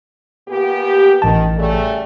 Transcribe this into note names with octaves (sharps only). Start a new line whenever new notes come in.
A#2 B3 G4
A1 D#3 A5
C#3 G3 A3